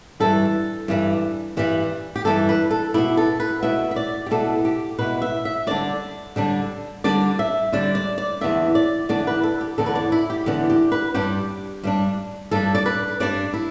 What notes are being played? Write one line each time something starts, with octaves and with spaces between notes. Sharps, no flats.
G2 E3 G3 A4
G2 E3 G3
G2 E3 G3
G4
G2 E3 G3 A4
B4
A4
B2 B3 E4 G4
A4
B4
B2 B3 E4 E5
E5
D5
G4
B2 B3 E4 A4
G4
B2 B3 E4 B4
E5
E5
D3 G3 D4 D5
D3 G3 D4
D3 G3 D4 D5
E5
D3 G3 D4 D5
D5
D5
E2 D3 B3 D4 E5
D5
E2 D3 B3 D4 D5
B4
A4
G4
E2 D3 B3 D4 A4
B4
D5
E4
G4
E2 D3 B3 D4 G4
G4
B4
G2 G3 D4 G4
G2 G3 D4
G2 G3 D4 A4
D5
B4
G2 G3 D4 D5
E4